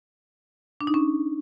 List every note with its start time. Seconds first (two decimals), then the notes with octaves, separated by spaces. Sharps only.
0.81 D4
0.87 D#4
0.94 C#4